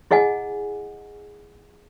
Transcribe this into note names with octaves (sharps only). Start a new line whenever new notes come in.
E4 G#4 D#5 F#5 G#5